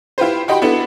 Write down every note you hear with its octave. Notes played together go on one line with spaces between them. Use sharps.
E4 F4 G4 B4 C5
F#4 G4 D#5 G5 B5 C6
B3 D4 E4 F#4 A4 B4